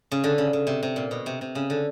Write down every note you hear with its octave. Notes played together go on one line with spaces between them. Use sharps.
C#3
D3
C#3
C#3
C3
C3
A#2
B2
C3
C3
C#3
D3